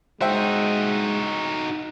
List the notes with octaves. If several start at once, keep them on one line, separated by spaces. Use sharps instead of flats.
G#3 D#4 F#4 C5 E5 G5